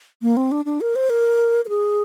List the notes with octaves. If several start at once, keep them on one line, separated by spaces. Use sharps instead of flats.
A#3
C4
D4
D4
A#4
C5
A#4
A#4
G#4